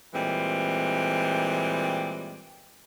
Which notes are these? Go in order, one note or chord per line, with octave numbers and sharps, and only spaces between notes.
A#2 E3 G3 G#3 C4